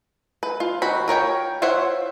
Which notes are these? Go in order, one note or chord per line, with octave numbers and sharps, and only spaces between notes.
B4
F4
D#3 F#4 B5
F4 A#4 C#5 G5
F4 C5 C#5 E5 F#5